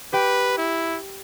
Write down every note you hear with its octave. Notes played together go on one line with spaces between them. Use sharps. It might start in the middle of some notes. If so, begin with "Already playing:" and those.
G4 B4 G5
E4